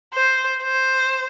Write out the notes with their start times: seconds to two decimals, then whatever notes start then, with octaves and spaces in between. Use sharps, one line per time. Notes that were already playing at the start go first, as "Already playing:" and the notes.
0.14 C5
0.63 C5